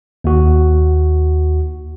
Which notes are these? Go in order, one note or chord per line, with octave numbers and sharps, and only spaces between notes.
D#2 F#4